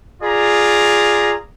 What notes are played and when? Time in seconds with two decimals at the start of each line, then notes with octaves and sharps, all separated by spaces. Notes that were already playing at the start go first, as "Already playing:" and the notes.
0.23 F4 G#4 D5 A#5